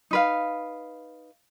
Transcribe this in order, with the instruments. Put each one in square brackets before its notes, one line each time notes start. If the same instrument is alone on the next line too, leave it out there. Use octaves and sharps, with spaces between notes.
[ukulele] D#4 B4 F5